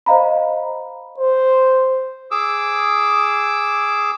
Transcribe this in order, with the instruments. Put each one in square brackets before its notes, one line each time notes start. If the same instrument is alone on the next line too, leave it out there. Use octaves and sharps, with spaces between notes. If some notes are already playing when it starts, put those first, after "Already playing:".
[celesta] C5 D#5 F5 A#5 B5
[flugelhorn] C5
[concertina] G#4 D6 E6